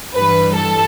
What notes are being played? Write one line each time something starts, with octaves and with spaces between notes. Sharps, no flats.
G2 E3 G3 B4
A4